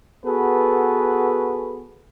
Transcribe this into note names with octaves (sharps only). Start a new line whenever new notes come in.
B3 F#4 G#4 A4 B4